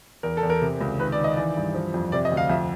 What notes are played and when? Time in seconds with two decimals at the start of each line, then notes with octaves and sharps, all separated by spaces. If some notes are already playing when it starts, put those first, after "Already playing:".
0.23 E2 A#4
0.37 A4
0.43 E2
0.50 A#4
0.62 C3
0.81 C#2
0.99 D#3 B4
1.12 D5
1.19 D#3
1.24 D#5
1.37 E3 D5
1.56 G2
1.74 F3
1.94 F2
2.12 C3 D5
2.25 D#5
2.32 D2
2.37 F5
2.50 F2 E5